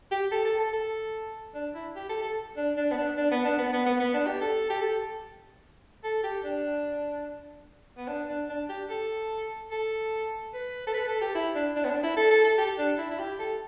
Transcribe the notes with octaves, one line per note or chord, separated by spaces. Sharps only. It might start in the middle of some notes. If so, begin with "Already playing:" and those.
G4
A4
A4
A4
A4
D4
E4
G4
A4
A4
D4
D4
B3
D4
D4
B3
D4
B3
B3
B3
B3
D4
G4
A4
G4
A4
A4
G4
D4
B3
D4
D4
D4
G4
A4
A4
B4
A4
B4
A4
G4
E4
D4
D4
B3
D4
E4
A4
A4
A4
G4
D4
E4
E4
G4
A4